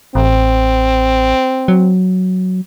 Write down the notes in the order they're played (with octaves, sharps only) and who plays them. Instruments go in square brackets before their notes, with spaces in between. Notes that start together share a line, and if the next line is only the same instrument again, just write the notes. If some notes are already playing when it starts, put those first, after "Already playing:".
[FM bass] A1 [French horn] C4
[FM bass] F#3